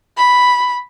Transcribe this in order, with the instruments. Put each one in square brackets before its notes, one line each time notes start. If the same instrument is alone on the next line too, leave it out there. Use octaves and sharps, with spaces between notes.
[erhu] B5